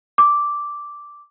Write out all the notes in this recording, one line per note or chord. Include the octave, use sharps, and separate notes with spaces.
D6